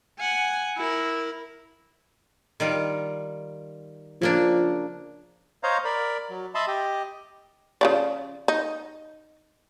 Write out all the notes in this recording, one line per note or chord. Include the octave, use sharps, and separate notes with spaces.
F#5 G#5
E4 A#4
D#3 G3 F4
C#3 F3 A#3 D4
C5 C#5 D#5 F5 A#5
A#4 D5 B5
F#3
D#5 E5 A5 B5 C6
G4 D#5
C#3 F3 D5
D#4